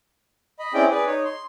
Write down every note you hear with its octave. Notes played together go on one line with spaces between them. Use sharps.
D#5 B5
C4 C#4 E4 G#4 D5 G5
G#4 B4 D5
D#4 C#5
C6